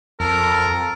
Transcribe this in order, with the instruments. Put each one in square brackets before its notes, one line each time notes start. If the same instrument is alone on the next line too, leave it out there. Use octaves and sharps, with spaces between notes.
[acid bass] F2 [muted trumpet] A4 [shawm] A#4